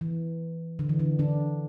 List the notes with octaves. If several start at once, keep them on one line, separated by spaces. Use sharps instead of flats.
E3
D3
E3
D3
D3 D4